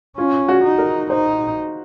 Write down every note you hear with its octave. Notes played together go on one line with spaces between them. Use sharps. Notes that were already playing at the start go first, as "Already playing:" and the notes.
C#4 F4
F#4
D#4
A#4
D#4 C5